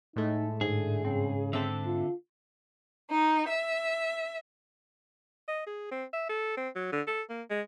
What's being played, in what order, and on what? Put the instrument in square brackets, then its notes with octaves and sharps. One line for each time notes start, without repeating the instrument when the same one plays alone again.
[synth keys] A2 G#3 A3 [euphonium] D#4
[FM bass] G#2 [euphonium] D3 [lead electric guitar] G#4
[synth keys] G2 C4 [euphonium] C#3
[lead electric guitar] D3 A4 [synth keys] C4 E5
[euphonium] F4
[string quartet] D#4
E5
[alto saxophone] D#5
G#4
C4
E5
A4
C4
F#3
D3
A4
A#3
G#3